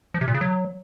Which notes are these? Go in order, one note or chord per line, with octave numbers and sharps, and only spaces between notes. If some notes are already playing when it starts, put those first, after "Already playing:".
F3
C3
A#2
C#3
F#3